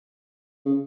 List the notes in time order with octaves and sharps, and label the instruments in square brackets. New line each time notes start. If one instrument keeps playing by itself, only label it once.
[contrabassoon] C#3